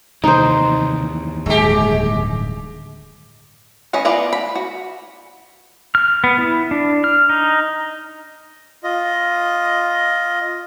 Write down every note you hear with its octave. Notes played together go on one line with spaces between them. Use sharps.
D#2 C3 D#3 E3 D#4 C5
D1 G2 G#3 G4
E3 C#4 A#4 D#5
B3 E4 F4 D5 A#5
B5
F#4
F6
B3
E4
D4
F6
D#4
F4 D#5